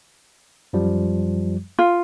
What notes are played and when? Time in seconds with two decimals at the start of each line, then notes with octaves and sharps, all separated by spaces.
0.73 F#2 F3 G3
1.79 F4